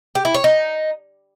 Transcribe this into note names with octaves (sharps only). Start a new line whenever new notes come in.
G4
E4
C#5
D#4